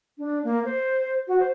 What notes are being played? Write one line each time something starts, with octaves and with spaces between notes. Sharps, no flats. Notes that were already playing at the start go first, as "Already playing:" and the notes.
D4
A#3
C5
F#4
C5